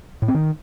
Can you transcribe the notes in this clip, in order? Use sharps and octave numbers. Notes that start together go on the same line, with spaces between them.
A2
C4
D#3